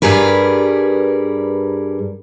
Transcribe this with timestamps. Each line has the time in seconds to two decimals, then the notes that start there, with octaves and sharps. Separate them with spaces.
0.02 G2 G3 G#4 A#4 B4